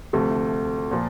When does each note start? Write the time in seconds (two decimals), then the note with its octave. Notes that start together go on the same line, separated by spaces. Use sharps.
0.13 D2 C3 F3 A3
0.91 A#2 F3